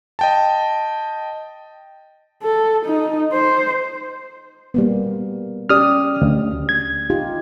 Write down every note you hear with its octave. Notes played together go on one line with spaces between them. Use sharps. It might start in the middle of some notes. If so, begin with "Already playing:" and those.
D#5 G5 A5
A4
D#4
C5
G3 A#3 B3
C#4 G4 D5 D#6 F6
D2
G#6
D#4 F4 G4